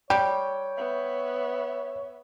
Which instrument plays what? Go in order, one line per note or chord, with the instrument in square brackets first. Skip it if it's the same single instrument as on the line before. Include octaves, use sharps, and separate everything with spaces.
[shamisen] G3 [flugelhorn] C#5 [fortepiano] G5
[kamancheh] B3 E5